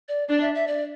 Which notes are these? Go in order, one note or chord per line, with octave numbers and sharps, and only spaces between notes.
D5
D4 D5
E5
E5
D5